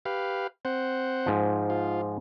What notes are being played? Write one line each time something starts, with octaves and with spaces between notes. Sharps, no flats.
G4 B4 F5
C4 C5 F#5
G#2 F3
F4